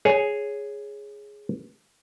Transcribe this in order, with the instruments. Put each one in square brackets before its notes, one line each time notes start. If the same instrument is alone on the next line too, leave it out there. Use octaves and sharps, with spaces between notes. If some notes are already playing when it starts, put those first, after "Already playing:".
[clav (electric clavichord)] G#4 C#5